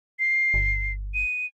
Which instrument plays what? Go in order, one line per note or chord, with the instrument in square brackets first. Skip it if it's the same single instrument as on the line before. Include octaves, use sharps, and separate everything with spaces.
[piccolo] C7
[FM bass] G1
[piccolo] D#7